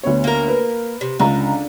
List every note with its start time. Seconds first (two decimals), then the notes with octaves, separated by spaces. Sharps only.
0.03 D2 B3 C#5
0.24 A#3 A#4
0.48 B4
1.01 C3
1.19 C#2 D3 A#5